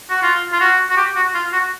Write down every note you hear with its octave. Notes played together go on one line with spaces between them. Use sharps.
F#4
F4
F4
F#4
F#4
G4
F#4
F4
F#4